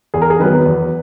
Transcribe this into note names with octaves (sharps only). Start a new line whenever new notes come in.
E2 G#4
A#4
G#4
D#3 F#3 B3 B4
E2